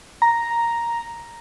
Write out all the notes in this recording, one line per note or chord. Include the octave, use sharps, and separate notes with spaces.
A#5